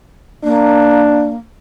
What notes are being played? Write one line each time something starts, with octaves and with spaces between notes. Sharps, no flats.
A#3 D4